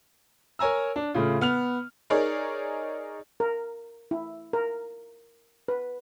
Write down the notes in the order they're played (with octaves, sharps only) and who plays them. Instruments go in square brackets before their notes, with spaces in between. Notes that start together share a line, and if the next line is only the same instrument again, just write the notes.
[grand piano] A#4 C#5 G#5 A#5 E6
D4
A2 C#3 F4
B3 F6 F7
[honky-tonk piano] D#4 G#4 A#4 C#5 D5
[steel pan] A#4
E4
A#4
B4